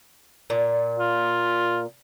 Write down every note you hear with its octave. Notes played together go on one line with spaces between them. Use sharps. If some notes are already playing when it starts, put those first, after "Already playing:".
A#2
F4